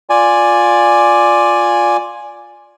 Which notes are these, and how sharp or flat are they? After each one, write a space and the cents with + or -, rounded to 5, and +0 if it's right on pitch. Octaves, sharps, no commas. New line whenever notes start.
F4 +10 D5 +0 G#5 +0